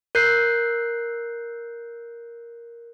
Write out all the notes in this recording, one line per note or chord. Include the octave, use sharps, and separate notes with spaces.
A#4 F#6 G6 C7